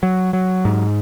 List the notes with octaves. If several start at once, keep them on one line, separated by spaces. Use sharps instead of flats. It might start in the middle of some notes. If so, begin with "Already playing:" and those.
F#3
F#3
G#2